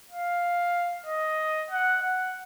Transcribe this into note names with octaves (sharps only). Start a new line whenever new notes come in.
F5
D#5
F#5
F#5